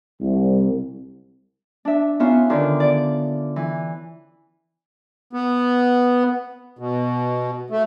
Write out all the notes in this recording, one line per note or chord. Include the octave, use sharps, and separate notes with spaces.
C2
D4 E5
B3 C#4 D#4 F4 E5 F5
D3 D#3 F4
D5
E3
B3
B2
A3